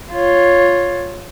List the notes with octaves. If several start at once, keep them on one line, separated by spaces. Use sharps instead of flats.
F4 C#5